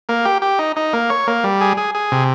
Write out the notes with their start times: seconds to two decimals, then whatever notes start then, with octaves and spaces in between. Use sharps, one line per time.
0.09 A#3
0.25 G4
0.42 G4
0.59 D#4
0.76 D#4
0.93 A#3
1.10 C#5
1.27 A#3
1.44 G3
1.61 G#4
1.77 G#4
1.95 G#4
2.12 C3